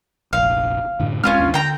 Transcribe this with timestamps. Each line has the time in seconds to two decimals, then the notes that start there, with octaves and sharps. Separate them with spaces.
0.33 F1 A#1 F5
1.00 F#2 A2 D3
1.24 D1 G#3 C4 C#4 F4 F6
1.38 A1 D#2 D4
1.54 D3 G5 A#5